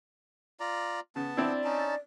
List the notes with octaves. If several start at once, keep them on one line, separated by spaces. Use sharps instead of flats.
F4 D5 A#5
C#3 B3 A5
C4 D4 E4 D5
C#4 D#4 A5